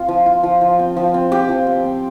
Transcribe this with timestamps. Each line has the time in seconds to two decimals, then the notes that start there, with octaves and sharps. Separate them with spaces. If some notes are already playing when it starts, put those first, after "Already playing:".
Already playing: C4 F4
0.08 F3
0.26 F4
0.43 F3
0.61 F3
0.79 C4
0.97 F3
1.14 C4
1.31 C4 G4
1.49 F3
1.67 C4
1.84 C4